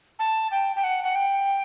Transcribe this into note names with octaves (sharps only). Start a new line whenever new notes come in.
A5
G5
G5
F#5
F#5
G5